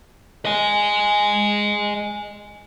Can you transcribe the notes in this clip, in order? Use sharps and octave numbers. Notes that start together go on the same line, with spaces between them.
D#5 G#5